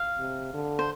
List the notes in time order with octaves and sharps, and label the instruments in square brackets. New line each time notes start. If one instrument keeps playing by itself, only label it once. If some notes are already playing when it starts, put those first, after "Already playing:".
Already playing: [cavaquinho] F5
[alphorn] C3
D3
[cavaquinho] C5